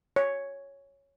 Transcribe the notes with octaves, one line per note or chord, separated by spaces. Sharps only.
C#5